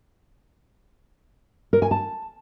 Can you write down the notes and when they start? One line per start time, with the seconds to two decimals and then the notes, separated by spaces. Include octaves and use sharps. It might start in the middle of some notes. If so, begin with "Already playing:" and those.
1.73 A#4
1.82 G#5
1.91 A5